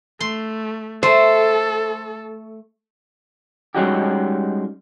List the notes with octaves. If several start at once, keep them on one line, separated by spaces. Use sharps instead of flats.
A3 C6
A3 A4 C5
G3 G#3 C#4 D#4 F#4 G4